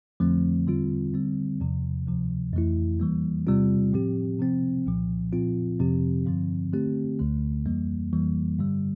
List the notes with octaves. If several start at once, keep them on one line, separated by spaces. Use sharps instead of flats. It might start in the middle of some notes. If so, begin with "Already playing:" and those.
F2 D3 F3 A3 C4
E2 D3 G3 C4 F4
D3 G3 C4
E2 C3 F3
D2 C3 F3
F2 E3 A3 E4
E2 E3 G3 A#3
E2 C3 G3 C4 F4
A2 F3 C4 G4
C3 F3 C4
C2 A#2 F3
A#2 F3 C4 F4
F2 C3 F3 C4 G4
G2 D3 F3 C4
D3 A3 C4 G4
D2 D3 A3
F2 E3 G3 A#3
F2 E3 G3 A#3
G2 D3 G3